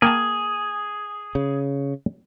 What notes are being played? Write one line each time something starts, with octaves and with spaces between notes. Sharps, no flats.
A#3 G#4 G5 A5
C#3